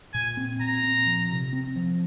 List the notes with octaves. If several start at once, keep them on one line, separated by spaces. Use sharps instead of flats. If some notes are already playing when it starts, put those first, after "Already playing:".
A#2 G#5
C4
A#2 A#5
C4
F3
C3
C4
F3